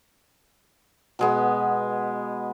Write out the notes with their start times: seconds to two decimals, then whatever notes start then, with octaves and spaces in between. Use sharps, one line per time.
1.19 B2 G#3 B3